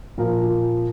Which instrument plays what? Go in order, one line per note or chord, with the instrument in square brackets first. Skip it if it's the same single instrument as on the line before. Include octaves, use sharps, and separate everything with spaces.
[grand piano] A#2 F3 A#4